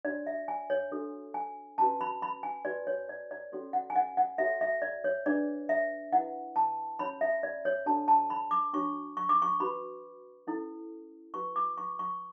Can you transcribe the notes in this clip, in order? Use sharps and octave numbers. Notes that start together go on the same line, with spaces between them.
D4 F#4 C#5 D5
E5
G#5
C#5
D4 F#4 A4 C#5
G#5
C#4 F#4 B4 A5
B5
B5
G#5
F#4 B4 D5
C#5
D5
D5
C#4 F#4 A4 C#5
F#5
G#5
F#5
F#5
F#4 A4 C#5 E5
E5
D5
C#5
D4 G#4 B4 D5
E5
E4 B4 F#5
A5
C#4 F#4 C#5 B5
E5
D5
C#5
D4 F#4 A4 C#5 A5
A5
B5
D6
D4 F#4 C#5 C#6
C#6
D6
C#6
F#4 B4 B5
C#4 E4 A4
F#4 B4 C#6
D6
C#6
C#6